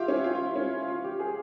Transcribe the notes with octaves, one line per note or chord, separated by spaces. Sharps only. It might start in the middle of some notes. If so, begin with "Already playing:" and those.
Already playing: F4 G4 E5
C#4
F4
F4
E4
C#4
F4
G4
G#4